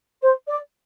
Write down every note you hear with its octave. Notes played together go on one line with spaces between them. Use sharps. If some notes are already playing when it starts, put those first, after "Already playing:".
C5
D5